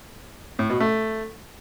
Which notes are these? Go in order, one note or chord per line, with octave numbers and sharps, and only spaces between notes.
A2
B2
A3